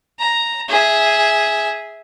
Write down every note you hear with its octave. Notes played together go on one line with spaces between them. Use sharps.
A#5
G#4 E5